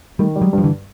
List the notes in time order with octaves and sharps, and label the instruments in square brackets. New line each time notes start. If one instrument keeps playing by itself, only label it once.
[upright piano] D#3 [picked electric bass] G3 A3
[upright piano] G3
[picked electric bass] F#3 G#3
[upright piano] G2
[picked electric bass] F3
D3 E3